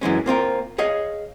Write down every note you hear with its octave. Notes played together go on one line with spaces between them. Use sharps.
F#2 E3 G#3 C#4
A#3 C4 F4 A#4
G#4 C#5 D#5 F5